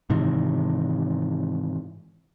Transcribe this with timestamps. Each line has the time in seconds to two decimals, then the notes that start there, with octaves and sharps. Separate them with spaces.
0.10 G#2 C3 D#3 E3